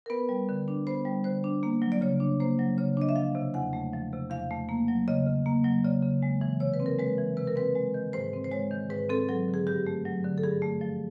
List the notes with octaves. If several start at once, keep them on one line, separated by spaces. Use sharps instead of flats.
A#4
B3 B4
G3
D3
D4
B3 C5
G3
D3 C5
D4
A#3
F#3
D5
C#3 C#5
D4
A#3 C5
F#3
C#3 C#5
D4 D#5
E5
F3 F5
C3
E2 F#5
A3
F3
C3
E2 F5
A3
A#3
F#3
C#3 D#5
C#3
A#3
F#3
C#3 D5
C#3
G#3
E3
C3 C#5
B4
C4
A#4
G#3 B4
E3
C3 B4
A#4
C4 B4
G#3
D#3
G#2 C5
C4
C5
G#3 C#5
D#3
G#2 B4
C4 A4
F#3 A4
D3
G#4
G2 G4
A3
F#3
D3
A4
G2 G#4
A3
F3